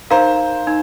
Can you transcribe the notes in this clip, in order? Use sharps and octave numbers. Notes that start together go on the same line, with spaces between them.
D#4 A#4 C5 F5 A#5
D#4